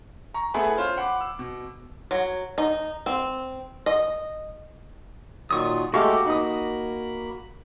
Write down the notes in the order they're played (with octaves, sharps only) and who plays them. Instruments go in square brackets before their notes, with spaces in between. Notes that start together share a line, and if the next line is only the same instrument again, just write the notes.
[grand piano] A#5 C#6
A3 B3 E4 G#4 A4 B4
C#4 F4 C5 F5
F#5 B5 D6
E6
B2
[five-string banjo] F#3
D#4
C4
D#5
[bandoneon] A#2 D#3 F#3 [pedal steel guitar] F4 C#6 D#6
[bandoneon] G#3 A3 A4 [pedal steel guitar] F#4 D6 [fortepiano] G4 F5 C#6
[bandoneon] A#3 B5 [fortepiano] D#4 D#6